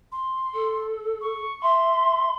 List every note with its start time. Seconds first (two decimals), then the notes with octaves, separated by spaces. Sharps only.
0.11 C6
0.54 A4
1.20 C#6
1.63 E5 C6